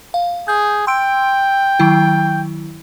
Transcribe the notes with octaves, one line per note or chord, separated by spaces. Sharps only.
F5
G#4 G6
G5 C6 E6 D7
D#3 F#3 E4